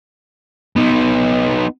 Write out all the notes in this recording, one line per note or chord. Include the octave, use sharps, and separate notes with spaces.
B3 D#4